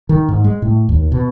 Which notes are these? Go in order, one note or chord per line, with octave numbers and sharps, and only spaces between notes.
D#3
G#2
G#3
A2
D#2
B2